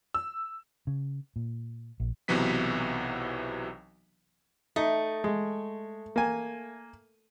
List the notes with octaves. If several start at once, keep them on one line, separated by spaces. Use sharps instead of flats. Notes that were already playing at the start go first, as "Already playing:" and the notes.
E6
C#3
A#2
A#1
B1 C3 E3 F#3 B3 B6
A3 D#4
G#3
A#3 G#5